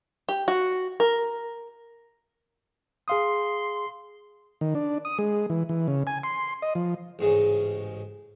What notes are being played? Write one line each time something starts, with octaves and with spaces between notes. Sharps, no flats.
G4
F#4
A#4
G#4 F5 C6 D#6
D#3
D4
D#6
G#3
E3
E3
C#3
G#5
C6
D#5
F3
A1 G#2 C#3